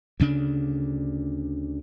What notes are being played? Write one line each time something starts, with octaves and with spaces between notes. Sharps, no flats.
D2 C#3 D4